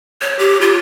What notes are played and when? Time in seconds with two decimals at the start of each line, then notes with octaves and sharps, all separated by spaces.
0.22 C#5
0.39 G4
0.61 F4